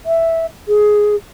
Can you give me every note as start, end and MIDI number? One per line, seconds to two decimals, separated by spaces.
0.06 0.46 76
0.67 1.15 68